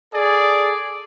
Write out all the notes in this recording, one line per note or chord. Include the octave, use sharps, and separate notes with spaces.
G#4 A4 D5